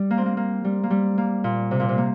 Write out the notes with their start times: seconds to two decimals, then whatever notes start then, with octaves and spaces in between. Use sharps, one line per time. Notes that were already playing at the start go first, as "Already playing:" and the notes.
Already playing: G3
0.11 A#3
0.18 C4
0.26 A#3
0.37 A#3
0.64 G3
0.83 A#3
0.90 G3
1.18 A#3
1.44 A#2
1.71 C3
1.80 A#2
1.89 C3
1.98 A#3